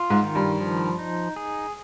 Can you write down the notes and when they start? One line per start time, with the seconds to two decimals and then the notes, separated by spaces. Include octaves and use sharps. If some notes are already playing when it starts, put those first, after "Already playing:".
Already playing: F4
0.10 G#2
0.23 D#3
0.35 G2
0.61 F3
0.99 D#4
1.36 G#4